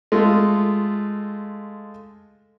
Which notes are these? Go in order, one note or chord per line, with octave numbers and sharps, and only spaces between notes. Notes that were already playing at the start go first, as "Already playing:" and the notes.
G#3 A3 F4